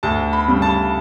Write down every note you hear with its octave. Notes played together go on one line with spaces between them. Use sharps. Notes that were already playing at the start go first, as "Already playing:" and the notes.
D2 A5
B5
C#3 G3
A5